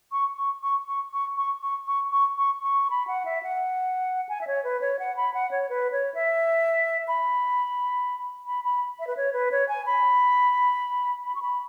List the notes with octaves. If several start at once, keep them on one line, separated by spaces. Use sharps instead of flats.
C#6
C#6
C#6
C#6
C#6
C#6
C#6
C#6
C#6
C#6
C#6
B5
F#5
E5
F#5
G#5
E5
C#5
B4
C#5
F#5
B5
F#5
C#5
B4
C#5
E5
B5
B5
B5
E5
B4
C#5
B4
C#5
G#5
B5
B5
C#6
B5